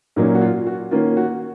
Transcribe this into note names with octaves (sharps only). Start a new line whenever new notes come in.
A#2 F#3 A#3 C#4 D#4
F#4
F4
F#4
D#3 A#3 C#4 F4
F#4